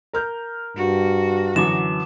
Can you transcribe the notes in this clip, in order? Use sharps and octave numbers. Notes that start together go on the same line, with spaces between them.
A#4 F6 G6
G2 F#4
F#2 D3 E3 D6 E7